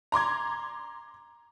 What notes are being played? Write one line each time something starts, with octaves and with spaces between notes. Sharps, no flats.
A#5 C6 D6 G#6